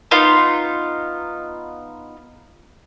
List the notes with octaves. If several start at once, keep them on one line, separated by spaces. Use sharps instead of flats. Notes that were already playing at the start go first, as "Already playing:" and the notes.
B3 D#4 F4